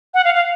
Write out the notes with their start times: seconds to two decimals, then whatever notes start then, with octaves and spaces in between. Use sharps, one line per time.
0.14 F#5
0.24 F5
0.35 F5